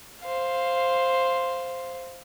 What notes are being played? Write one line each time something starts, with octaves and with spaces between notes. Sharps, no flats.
C5 F5